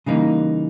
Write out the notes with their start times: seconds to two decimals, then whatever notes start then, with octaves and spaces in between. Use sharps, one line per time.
0.06 C#3 E3 G3 A#3 D#4